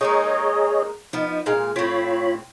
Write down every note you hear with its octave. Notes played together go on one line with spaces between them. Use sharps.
G#3 A#3 D#4 G#4 C#5 D#5
F3 B3 D#4
A#2 G#3 F5
A2 C4 F4 C#5 B5